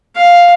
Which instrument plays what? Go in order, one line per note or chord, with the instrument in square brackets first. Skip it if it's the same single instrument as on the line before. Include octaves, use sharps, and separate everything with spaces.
[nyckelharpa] F5